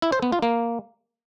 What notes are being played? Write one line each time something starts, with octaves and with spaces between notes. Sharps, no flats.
E4
C5
B3
F4
A#3